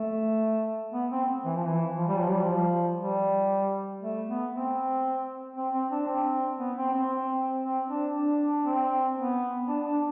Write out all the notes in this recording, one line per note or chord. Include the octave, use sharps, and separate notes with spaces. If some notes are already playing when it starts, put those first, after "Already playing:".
Already playing: A3
B3
C4
E3
F3
E3
F3
G3
F3
G3
F3
G3
A3
B3
C4
C4
C4
D4
C4
B3
C4
C4
C4
D4
D4
C4
B3
D4
D4